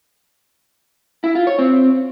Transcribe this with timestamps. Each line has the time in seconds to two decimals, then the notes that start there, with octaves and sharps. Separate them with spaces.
1.24 E4
1.35 F4
1.47 C#5
1.59 C4